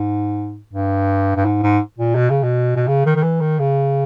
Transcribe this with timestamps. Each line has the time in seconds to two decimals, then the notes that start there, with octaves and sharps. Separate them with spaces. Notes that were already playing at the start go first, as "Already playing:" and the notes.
Already playing: G#2
0.73 G2
1.36 G2
1.45 G#2
1.63 G#2
1.99 A#2
2.16 B2
2.30 C#3
2.43 B2
2.76 B2
2.88 C#3
3.06 D#3
3.16 D#3
3.23 E3
3.41 D#3
3.59 C#3